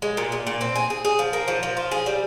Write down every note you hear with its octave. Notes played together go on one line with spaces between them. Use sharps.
G#3
A#2
A#2
A#2
C4
G#4
G#4
G#4
F3
A#3
F3
F3
F4
G#4
G3